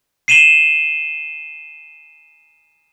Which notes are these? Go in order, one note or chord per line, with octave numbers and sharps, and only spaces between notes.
C7 D#7 E7 F#7 G7